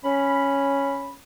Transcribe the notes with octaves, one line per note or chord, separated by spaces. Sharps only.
C#4 B5